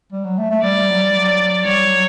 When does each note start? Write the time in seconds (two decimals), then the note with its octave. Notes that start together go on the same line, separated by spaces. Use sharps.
0.12 G3
0.24 F#3
0.38 A3
0.50 A3
0.63 G3 D5
0.88 F#3
1.02 G3
1.16 F#3
1.65 G3 C#5
1.91 F#3